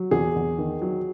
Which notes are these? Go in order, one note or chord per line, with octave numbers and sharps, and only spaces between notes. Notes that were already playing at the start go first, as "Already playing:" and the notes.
Already playing: F#3
E2 G#4
E2
D#3
F#3